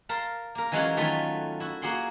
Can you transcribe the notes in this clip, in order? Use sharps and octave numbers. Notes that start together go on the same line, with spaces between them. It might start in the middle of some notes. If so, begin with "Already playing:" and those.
A#4 F5 A5 A#5 C6
A#3 A#4
E3 F#3 G#3 C#4 F4 F#4
D#3 F#3 A3 B3 F4 B4
E4 F#4
A#3 F#4 G#4 F#5 C6